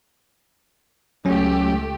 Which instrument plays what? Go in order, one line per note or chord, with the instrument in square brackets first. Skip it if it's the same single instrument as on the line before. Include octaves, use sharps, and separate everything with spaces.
[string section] C#2 A3 G4 [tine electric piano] F#3 C#4